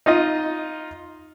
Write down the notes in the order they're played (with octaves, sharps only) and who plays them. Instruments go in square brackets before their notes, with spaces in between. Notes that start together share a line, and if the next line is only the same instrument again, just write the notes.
[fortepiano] D#4 F4 D#5